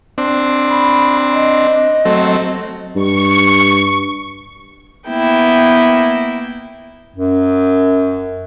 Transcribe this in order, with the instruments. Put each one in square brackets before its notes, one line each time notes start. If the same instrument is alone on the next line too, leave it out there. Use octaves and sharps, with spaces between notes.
[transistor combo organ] C4 D4
[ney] B5
D#5
[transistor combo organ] F#3 A3 C4
[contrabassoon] G2 [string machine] C#6
[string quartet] A#3 B3 E4 G5
[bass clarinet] F#2